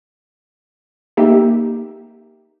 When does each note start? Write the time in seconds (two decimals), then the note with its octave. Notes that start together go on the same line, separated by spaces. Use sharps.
1.17 A#3 D#4 G4 E5